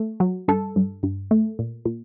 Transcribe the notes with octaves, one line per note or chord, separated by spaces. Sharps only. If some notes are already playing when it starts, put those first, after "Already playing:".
Already playing: A3
F#3
G2 A4
G2
G2
A3
A#2
A#2